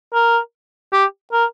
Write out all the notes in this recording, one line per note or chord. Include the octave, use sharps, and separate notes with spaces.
A#4
G4
A#4